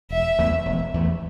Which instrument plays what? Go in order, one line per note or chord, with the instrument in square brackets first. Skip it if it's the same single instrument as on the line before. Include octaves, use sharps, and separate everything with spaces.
[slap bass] E1 [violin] E5
[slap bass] E2 E3 A3
E1
E2 E3 A3